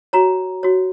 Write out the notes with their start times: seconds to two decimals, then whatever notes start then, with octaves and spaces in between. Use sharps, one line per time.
0.13 F#4 C#5 A#5
0.63 F#4 C#5